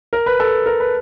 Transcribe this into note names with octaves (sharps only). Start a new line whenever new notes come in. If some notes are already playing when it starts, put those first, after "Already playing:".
A#4
B4
A4
A#4
B4